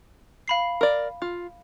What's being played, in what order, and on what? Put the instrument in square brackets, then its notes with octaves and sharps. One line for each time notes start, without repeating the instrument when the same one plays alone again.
[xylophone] F5 B5 C7
[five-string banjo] A#4 D5
F4